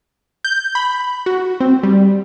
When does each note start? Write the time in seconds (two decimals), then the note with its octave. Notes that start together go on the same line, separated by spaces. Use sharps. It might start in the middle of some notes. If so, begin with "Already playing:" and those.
0.45 G6
0.75 B5
1.26 F#4
1.60 C4
1.83 G3